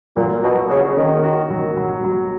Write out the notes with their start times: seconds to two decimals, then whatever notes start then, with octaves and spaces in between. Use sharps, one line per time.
0.17 A#2 F#3
0.43 B2 F#4
0.70 C#3 F#4
0.97 D#3 C#4
1.24 F#4
1.50 F#3
1.77 F#3
2.04 F#3